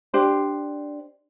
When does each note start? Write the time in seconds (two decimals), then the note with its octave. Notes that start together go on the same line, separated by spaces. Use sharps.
0.14 D4 G4 C5